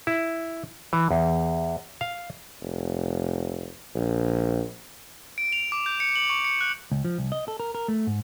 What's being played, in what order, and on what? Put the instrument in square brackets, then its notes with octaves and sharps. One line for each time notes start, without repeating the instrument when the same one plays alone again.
[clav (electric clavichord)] E4
E3
E2
F5
[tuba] F1
A#1
[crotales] D7
F7
D6
G6
C#7
F#7
C#6
C#7
F#6
[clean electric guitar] C#2
F3
C2
D#5
A4
A#4
A#4
A3
G#2